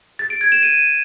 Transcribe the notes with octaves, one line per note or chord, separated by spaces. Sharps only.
A6
D7
G#6
E7
D#7